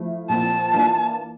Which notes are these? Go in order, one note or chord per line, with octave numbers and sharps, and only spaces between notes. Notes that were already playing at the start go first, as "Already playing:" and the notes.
Already playing: F3 A3 E4
A#2 F3 C4 A5
E3 A#3 D4 F4